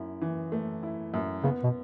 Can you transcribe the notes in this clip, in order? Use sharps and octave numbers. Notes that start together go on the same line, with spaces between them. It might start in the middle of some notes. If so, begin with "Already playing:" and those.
Already playing: F#2 E4
E3
A3
E4
F#2
C#3 B3
B2